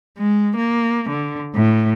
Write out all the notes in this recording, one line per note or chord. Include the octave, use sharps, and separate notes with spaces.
G#3
A#3
D3
A2